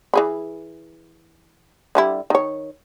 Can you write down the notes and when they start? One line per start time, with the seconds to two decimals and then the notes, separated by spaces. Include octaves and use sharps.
0.14 E3 G#4 B5
1.95 D3 G3 E4
2.30 D#3 C#5